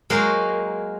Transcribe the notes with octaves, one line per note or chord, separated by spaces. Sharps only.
F#3 G#3 A#3 F#4 A#4 C5